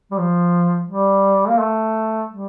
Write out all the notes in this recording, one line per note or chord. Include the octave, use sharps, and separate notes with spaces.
G3
F3
G3
A#3
A3
G3